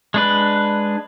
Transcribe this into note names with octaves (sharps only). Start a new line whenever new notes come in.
G#3 D4 B4